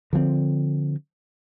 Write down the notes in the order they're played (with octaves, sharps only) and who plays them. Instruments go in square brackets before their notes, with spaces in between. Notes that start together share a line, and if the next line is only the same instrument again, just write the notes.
[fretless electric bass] D3 F3 G#3 C4